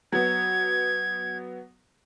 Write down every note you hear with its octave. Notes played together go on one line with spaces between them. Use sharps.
F#3 B3 G#6